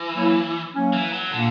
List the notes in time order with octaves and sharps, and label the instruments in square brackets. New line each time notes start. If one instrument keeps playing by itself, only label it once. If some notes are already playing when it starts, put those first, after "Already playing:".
Already playing: [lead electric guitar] E3
[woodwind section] F#3 A#3 E4
F#3 A#3 C#4
[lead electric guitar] E3
F#3
[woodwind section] A#2 A#3 [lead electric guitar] D3